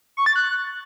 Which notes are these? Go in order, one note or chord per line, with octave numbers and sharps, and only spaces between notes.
C#6
A6
F#6